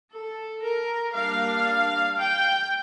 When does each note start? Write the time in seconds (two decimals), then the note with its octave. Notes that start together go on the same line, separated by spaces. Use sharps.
0.12 A4
0.63 A#4
1.15 G3 A#3 D4 F5
2.18 G5